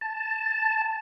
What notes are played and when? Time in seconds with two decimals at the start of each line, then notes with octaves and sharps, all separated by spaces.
0.01 A5